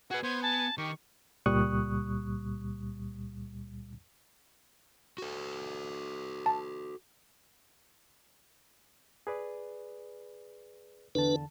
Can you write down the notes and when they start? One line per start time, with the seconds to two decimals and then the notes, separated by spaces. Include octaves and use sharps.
0.11 F#4 G#4 B4 F#5
0.23 B3 C5 G#6
0.42 G#5 A5
0.78 D#3 G4 C#6
1.46 C#2 A#2 G3 C#6 D#6 F#6
5.18 F#4 A4
6.46 A5
9.27 G#4 B4 D5
11.15 E2 D3 D4 B4 A5